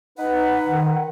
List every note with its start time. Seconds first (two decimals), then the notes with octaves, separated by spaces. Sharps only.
0.18 D#4 B4 F#5
0.67 D#3